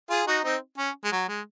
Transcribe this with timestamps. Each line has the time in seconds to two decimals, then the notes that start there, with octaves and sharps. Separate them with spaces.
0.10 F4 G#4
0.27 D#4 F#4
0.44 C4 D#4
0.78 C#4
1.04 G#3
1.12 F#3
1.28 G#3